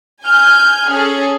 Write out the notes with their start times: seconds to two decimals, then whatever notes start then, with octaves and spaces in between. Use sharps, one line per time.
0.24 G#5 F6 G6
0.88 C#4 G#4 A4